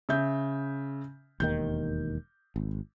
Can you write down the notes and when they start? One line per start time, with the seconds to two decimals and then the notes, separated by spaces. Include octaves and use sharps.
0.09 C#3 E5 G6
1.40 E1 D#2 D#3 G6
2.56 G#1